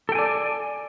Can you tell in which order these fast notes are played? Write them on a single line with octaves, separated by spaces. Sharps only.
A4 G5 G#5 D5